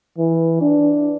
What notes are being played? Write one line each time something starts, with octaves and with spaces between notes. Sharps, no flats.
E3
D4